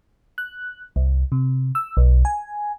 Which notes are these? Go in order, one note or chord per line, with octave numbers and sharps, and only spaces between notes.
F#6
C2
C3
E6
B1
G#5